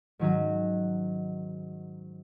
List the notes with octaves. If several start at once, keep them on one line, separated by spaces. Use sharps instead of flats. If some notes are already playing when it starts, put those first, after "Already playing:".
G#2 D#3 F#3 C#4 F#4